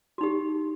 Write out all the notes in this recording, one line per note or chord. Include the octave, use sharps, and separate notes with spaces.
D#4 F#4 G4